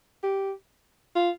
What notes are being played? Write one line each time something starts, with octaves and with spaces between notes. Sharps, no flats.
G4
F4